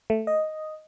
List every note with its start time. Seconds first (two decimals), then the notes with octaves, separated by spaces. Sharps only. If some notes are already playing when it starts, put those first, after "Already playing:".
0.10 A3
0.27 D#5